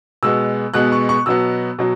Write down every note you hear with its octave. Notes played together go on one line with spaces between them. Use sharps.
B2 G#3 B3 E6
B2 G#3 B3 F#6
C#6
C#6
B2 F#3 B3 E6
B2 F#3